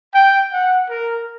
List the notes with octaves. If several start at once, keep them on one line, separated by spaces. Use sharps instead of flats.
G5
F#5
A#4